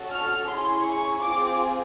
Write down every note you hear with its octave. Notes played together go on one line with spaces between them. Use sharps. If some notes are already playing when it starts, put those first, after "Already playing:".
Already playing: C#4 F#4 A4
F6
C#4 E4 G#4 C6
C#6
C4 F4 G#4 D6